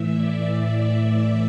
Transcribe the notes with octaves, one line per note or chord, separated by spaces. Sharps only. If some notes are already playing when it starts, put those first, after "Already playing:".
Already playing: A2 E3 E5
D5